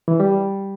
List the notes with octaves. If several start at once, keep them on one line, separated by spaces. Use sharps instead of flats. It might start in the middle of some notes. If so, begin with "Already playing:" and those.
E3
G3